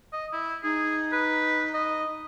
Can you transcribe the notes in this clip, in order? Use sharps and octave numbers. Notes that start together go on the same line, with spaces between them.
D#5
E4
D#4 G#4
B4
D#5